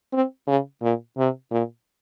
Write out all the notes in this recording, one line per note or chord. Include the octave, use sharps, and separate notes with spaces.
C4
C#3
A#2
C3
A#2